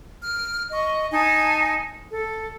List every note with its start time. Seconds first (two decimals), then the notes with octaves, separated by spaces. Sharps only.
0.22 F6
0.71 D#5 C#6
1.11 D#4 G#5 A5
2.13 A4